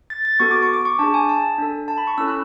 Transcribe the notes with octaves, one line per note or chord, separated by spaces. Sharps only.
A6
A6
B3 F#4 A4 C#6
D6
C#6
D6
C#6
D4 G#4 A5
G#5
A5
D4 A4
A5
B5
C#6
C#4 E4 A4 E6
F#6